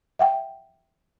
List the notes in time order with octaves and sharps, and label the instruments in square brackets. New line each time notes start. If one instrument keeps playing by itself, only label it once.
[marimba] E5 F#5 G5